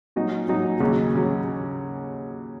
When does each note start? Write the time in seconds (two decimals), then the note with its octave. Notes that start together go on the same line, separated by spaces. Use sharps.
0.16 A#2 F#3 D#4 F#4 D#5
0.48 A#2 F#3 D#4 F#4 D#5
0.80 D#2 C#3 F#3
1.15 C#3 F#3